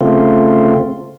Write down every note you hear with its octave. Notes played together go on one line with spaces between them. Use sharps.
C#3 A3 C4 F4